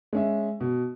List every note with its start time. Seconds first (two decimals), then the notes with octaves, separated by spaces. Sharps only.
0.13 G#3 C#4 E5
0.60 B2